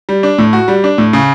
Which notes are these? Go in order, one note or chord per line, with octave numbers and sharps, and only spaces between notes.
G3
D4
A2
F#4
G3
D4
A2
C#3